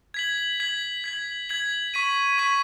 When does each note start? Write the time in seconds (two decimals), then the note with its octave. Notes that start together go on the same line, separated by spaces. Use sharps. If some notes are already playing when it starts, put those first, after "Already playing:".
0.14 G#6 B6 F#7
0.60 G#6 B6 F#7
1.04 G#6 B6 F#7
1.49 G#6 B6 F#7
1.94 C#6 B6 D#7
2.38 C#6 B6 D#7